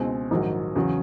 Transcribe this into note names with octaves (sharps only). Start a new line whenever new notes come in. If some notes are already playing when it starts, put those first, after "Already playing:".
Already playing: C#2 B2 G#3 C4
A#1 G#2 D#3 F#3
E2 C#3 F#3